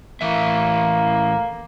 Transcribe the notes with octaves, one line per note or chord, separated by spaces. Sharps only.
A2 E3 A#3 E5